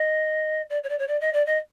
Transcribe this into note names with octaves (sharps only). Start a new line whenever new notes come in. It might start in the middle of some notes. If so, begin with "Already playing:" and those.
Already playing: D#5
D5
C#5
D5
C#5
D5
D#5
D5
D#5